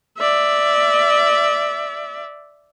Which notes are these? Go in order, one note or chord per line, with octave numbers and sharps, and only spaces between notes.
D5 E5